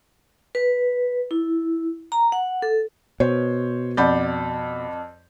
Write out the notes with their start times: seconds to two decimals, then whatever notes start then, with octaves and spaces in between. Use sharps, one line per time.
0.55 B4
1.31 E4
2.12 A#5
2.32 F#5
2.62 A4
3.20 B2 C5 C#5
3.97 F2 D5 F#5 B5 G6